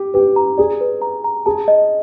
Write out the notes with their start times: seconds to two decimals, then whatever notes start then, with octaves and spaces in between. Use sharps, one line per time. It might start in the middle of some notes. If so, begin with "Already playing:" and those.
Already playing: G4
0.14 G4 B4
0.36 A#5
0.58 G#4 D5
0.81 B4
1.02 A#5
1.24 A#5
1.46 G#4 A5
1.68 D#5